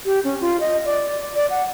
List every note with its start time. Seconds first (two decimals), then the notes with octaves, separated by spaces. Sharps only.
0.06 G4
0.24 C#4
0.41 F4
0.60 D#5
0.85 D5
1.36 D5
1.50 F#5